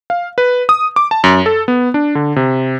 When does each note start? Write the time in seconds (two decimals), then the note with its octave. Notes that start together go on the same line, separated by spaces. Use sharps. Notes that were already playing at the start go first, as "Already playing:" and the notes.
0.10 F5
0.38 B4
0.69 D#6
0.96 D6
1.11 A5
1.24 F#2
1.46 A4
1.68 B3
1.94 D4
2.15 D3
2.36 C3